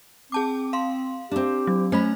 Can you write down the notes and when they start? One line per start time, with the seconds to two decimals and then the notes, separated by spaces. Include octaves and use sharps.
0.32 C4 G#4 A5 D6
0.73 F5 C6
1.31 C4 D4 G4
1.67 F#3
1.92 A3 C#4 C5 B5